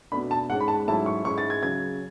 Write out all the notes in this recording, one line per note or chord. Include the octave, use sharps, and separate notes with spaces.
B2 A3 D4 B5
A5
G#2 G#3 C#4 F#5
B5
A5
G#2 F#3 A3 C#4 E4 A5
C#6
G#2 G#3 C#4 E4 C#6
A6
G#6
C#3 F#3 C#4 G#6